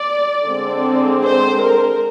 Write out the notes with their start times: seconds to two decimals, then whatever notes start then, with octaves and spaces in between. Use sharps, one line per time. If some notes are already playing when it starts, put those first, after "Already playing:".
Already playing: D5
0.46 D3 G#3 C4
1.23 C5
1.61 A#4